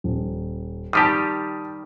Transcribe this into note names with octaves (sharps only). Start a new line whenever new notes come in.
D#1
D#3 G3 G4 A5 D#6